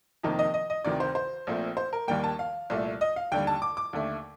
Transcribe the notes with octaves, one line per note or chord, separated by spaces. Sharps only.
F2 C3 D#3 A#3 D#4
D#5
D#5
D#5
D2 C3 D#3 D5
C5
C5
A#1 A#2 A3 C4
C5
A#4
D#2 D#3 G3 A#3 G5
A5
F5
C2 A#2 A3
D#5
F5
D#2 D3 G3 G5
A5
D6
D6
D#2 D3 A3